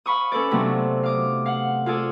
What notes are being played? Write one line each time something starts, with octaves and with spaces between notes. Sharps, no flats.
F5 B5 C#6 D#6
C#4 A4 B4 D5
C3 F#3 A3 B3 C4 D4
F5 D6 D#6
F5 F#5
F4 G#4 A4 D5